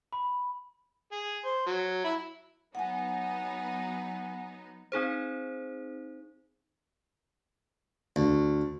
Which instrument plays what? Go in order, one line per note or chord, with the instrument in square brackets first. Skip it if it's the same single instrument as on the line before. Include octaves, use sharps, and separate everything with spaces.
[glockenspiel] B5
[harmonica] G#4
C5
F#3
E4
[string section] F#3 B3 D#4 [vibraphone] F#5 G#5
[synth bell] C4 D#4 G#4 C5
[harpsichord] D2